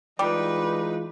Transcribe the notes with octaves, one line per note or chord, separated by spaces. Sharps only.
E3 G3 G#3 D#4 F4 B4 D6